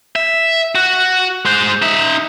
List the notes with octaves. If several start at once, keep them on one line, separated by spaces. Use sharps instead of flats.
E5
F#4
G#3 C5
D#4 E5